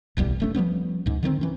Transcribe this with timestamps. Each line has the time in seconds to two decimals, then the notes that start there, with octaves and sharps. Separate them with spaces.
0.17 D1 B1 E2 G3
0.40 E1 A3 C#4
0.55 F3 G3 B3 C#4
1.06 C#2 G#2
1.23 D3 D#3 G#3 C4
1.41 E3 C#4